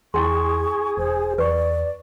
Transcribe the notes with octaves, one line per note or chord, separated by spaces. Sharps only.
E2 E4 G#4 G5 C6 C#6
E1 C5
E2 B4 D5 C#6